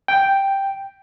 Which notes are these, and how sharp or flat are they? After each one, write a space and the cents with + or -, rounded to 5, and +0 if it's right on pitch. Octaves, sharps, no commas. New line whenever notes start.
G5 +0